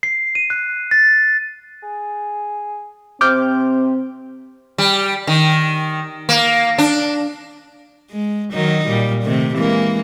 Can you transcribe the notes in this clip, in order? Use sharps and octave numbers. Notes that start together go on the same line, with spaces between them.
C7
D#7
F#6
A6
G#4
C3 C4 D6 F6 G6
G3
D#3
A#3
D4
G#3
D#3 F#3 D#4
A#2 G3
C3 D#3 A3
E3 G#3 A#3